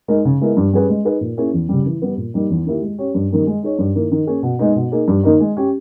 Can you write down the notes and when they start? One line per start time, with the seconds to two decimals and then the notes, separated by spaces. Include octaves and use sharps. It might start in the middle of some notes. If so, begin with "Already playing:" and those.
0.08 G#3 D#4 A#4
0.25 C#3
0.41 G#3 B3 E4 A#4
0.57 G2
0.73 G3 C#4 G#4 B4
0.89 G#3
1.05 D#4 G#4 B4
1.21 A#2
1.37 A#3 C#4 E4 G#4
1.54 E2
1.69 C#3 G3
1.86 E3
2.02 G3 B3
2.17 A#2
2.34 G3 A#3 D#4
2.50 E2
2.66 D#3 A#3 E4 G4
2.82 G#3
2.98 C#4 G4 C#5
3.15 G2
3.30 D#3 G3 A#3 C#4
3.47 G#3
3.63 D#4 G#4 C#5
3.79 G2
3.96 D#3 A#3 E4
4.12 D#3
4.27 A#3 C#4 G#4
4.43 B2
4.59 G#3 B3 D#4
4.76 B2
4.92 A#3 D#4 G#4
5.08 G2
5.24 D#3 A#3 D#4
5.40 G#3
5.57 C#4 G4